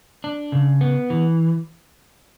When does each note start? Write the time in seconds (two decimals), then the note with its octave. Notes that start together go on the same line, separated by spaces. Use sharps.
0.24 D4
0.52 C#3
0.81 B3
1.10 E3